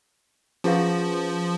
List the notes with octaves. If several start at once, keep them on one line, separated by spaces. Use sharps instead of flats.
F3 C#4 F4 G#4 B4 F5